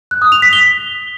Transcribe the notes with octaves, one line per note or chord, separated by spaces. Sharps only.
F#6
D#6
F7
B6
G7